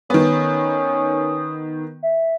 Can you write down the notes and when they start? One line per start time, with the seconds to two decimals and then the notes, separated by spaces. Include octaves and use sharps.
0.10 D#3 B3 C#4 D#6
2.03 E5